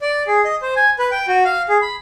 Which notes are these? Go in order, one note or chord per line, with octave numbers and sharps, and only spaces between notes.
D5
G#4
D#5
C5
G#5
B4
G5
F#4
F5
G#4
B5